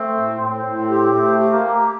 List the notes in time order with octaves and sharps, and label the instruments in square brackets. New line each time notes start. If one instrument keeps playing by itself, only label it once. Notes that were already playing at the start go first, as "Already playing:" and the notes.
Already playing: [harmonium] A3 [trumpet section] C4
[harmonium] A2
[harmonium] A2 [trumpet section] C4
[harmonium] A2
G4
[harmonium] A3 [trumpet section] C4
[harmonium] G4
[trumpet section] A#3
[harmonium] G4